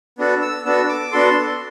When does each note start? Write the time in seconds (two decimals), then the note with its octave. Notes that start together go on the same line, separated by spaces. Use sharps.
0.18 B3 D4 F#4 A4
0.42 E6
0.65 B3 D4 F#4 A4 E6
0.89 D6
1.12 B3 D4 F#4 A4 C6